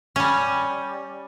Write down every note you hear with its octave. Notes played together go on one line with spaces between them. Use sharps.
G3 C#4